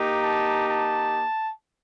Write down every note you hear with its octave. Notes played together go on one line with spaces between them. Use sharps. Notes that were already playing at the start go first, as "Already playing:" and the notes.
Already playing: A#3 D#4 G4
A5
A5